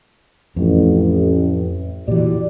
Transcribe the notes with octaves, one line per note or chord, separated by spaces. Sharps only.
A1 F2 A2
A#2 E3 F#4 G4 D5